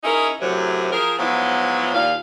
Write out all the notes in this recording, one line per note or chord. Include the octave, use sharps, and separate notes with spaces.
C#4 D#4 E4 G#4 A#4
F#2 A2 C3 F#3
F3 G#4 A#4
G#2 F3 F#3 B3 E4
D#2 A#2 F5